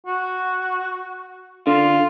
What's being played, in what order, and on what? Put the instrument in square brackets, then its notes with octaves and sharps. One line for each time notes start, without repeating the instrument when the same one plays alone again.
[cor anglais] F#4
[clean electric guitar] D3 [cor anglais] F4